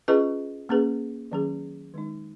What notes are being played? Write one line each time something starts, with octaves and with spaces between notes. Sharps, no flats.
C#4 F4 G#4 B4 D#5
A#3 C#4 G#4 B4
D#3 F#3 C#4 G#4
D#3 G#3 D#4